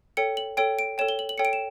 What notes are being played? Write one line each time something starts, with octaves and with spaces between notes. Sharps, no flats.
A4 C#5 G5 C#7
F#7
A4 C#5 G5 D7
D7
A4 C#5 G5 E7
G7
F#7
F#7
A4 C#5 G5 C#7
D7
E7